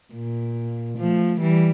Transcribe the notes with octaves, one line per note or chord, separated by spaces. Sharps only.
A#2
F3 A3
E3 G3